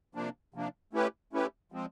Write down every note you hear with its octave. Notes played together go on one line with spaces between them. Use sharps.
C3 F3 A#3 D4
C3 F3 A#3 D4
A3 C#4 E4 G4 B4
A3 C#4 E4 G4 B4
F3 G#3 C4